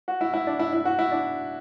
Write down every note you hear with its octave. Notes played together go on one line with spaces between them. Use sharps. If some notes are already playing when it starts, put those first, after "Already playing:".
F#4
E4
E4
D4
E4
E4
F#4
E4
D4